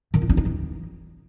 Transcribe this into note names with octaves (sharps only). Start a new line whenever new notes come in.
D#3
F4
D4
D#4
E3